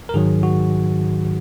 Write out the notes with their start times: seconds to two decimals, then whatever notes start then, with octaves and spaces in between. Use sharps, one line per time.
0.09 A#4
0.14 G#2 D#3 F#3 G#4
0.43 F#4